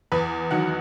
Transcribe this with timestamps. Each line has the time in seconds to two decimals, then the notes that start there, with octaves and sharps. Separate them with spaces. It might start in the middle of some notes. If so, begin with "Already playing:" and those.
0.12 E2 B4
0.51 D#3 F#3 F#5